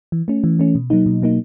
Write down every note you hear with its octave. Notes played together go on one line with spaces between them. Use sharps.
E3
A3 C#4
E3
A3 C#4
B2
F#3 A#3 D#4
B2
F#3 A#3 D#4